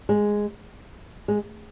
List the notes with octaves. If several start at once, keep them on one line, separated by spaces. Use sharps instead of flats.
G#3
G#3